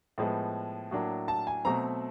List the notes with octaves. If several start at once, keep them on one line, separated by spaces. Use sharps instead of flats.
A2 F3 G#3 B3
A2 F#3 A#3 D4
A5
G#5
B2 F#3 A3 C4 A#5